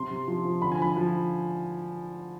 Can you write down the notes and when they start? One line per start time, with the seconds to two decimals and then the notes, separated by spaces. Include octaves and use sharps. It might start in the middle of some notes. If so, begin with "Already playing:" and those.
Already playing: C3 C6
0.11 C3
0.28 F3
0.45 F3
0.62 D3 B5
0.72 G#5
0.79 F3 B5
0.97 F3